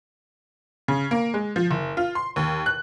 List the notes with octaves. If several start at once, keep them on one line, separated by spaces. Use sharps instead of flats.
C#3
A#3
G#3
F3
F#1
F4
C6
D#2
F#6